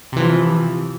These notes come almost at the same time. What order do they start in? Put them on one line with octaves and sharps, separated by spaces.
C3 E3 F3